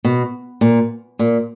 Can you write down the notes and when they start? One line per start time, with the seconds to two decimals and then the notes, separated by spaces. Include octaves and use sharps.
0.04 B2
0.61 A#2
1.19 A#2